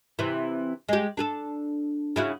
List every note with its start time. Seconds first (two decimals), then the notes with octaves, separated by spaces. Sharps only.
0.19 C3 E3
0.89 G#3 G4
1.17 D4 G#4 A4
2.16 C#3 E4 F#4